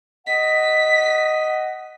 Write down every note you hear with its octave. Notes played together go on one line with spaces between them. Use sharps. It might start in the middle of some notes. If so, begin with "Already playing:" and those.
D#5 F#5 B6